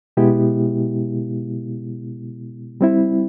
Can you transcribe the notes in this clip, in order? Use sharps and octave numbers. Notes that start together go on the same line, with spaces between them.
B2 G#3 B3 E4 G4
G3 C4 E4